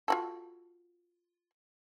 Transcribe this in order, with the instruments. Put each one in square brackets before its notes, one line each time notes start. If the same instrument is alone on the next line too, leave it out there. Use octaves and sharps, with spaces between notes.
[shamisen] F4 F#4 A4